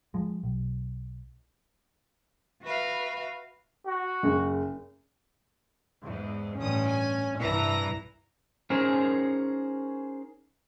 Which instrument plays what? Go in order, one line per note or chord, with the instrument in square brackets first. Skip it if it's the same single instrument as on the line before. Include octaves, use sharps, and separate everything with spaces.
[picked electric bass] F3 G#3
B1
[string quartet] F#4 B4 E5 F5
[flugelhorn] F#4
[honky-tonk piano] F#1
[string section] E2 G#2
[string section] A1 G2 D#6 [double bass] C#4
[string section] G#5
[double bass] C2 G2 [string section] E3 A#5 A#6
[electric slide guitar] C#4 D#4 G#4 A#4 C5